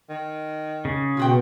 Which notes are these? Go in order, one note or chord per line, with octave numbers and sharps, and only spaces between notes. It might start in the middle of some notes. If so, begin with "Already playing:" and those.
D#3
C#3
B2 F4 F#4 G5